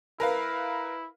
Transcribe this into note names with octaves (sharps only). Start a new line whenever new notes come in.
E4 A#4 B4 F5